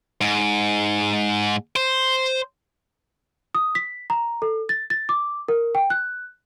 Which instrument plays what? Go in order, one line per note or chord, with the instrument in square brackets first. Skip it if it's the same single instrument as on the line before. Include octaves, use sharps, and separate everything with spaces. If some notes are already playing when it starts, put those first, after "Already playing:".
[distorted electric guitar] G#2
C5
[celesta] D#6
B6
A#5
A4
A6
A6
D6
A#4
G5
F#6